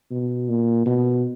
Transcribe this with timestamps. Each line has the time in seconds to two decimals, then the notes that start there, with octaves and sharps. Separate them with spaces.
0.11 B2
0.49 A#2
0.86 B2